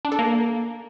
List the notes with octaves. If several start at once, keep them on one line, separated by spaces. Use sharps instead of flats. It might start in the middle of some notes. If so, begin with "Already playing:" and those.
D4
A4
A#3